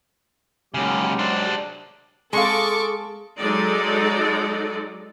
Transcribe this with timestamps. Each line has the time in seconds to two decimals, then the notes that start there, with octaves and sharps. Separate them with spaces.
0.74 D#2 C#3 F#3 G#3 G4
1.19 D4 C5
2.33 G#3 C4 G#4 A4 F5 C#6 D6
3.37 F#3 G#3 D#4 A4 D5